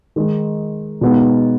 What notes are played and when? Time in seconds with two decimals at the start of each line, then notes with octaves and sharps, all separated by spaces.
0.16 D#3 G#3 D#4
1.01 B2 G#3 B3 D#4